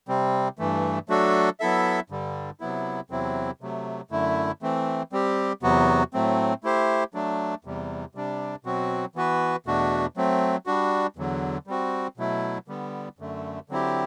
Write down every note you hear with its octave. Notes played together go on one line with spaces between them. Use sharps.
C3 G3 C4
G2 E3 A3
F#3 A3 D4 F#4 A4
F#3 B3 E4 A4 E5
G2 D3 G3
C3 F#3 B3 E4
E2 C3 F#3 C4 E4
C3 F#3 A3
F#2 D3 A3 E4
E3 A3 C4
G3 C4 G4
E2 C3 F#3 B3 F#4
A2 F#3 A3 C4
A3 E4 G4 C5
F#3 A3 D4
E2 C3 G3
C3 G3 D4
B2 F#3 C4 F#4
E3 B3 F#4 B4
E2 B2 A3 D4 F#4
F#3 A3 C4
G3 D4 F#4
E2 D3 F#3
G3 C4 F#4
B2 F#3 A3 E4
D3 G3 B3
F#2 D3 A3
D3 F#3 C4 E4 G4